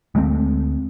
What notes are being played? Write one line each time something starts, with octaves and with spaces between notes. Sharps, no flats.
D2 G#3 A3 C4